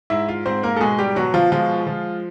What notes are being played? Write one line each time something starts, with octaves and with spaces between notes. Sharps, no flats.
G#2 E4 E5
F4 F5
G#2 C4 C5
A#3 A#4
A4
B2 G#3 G#4
G3 G4
B2 F#3 F#4
F3 F4
F3 G#3 F4
F3